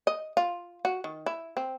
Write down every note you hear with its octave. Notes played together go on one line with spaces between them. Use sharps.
D#5
F4
F#4
D#3
E4
C4